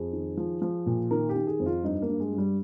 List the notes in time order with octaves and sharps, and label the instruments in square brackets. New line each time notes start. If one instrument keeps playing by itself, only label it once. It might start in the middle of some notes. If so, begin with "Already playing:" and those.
Already playing: [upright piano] F2 G#4
D#3
F3
F3
A#2
D#3 A#4
G4
D#3
G#4
F2
F4
G2 D#4
A#3
G2
G#3
G2
G3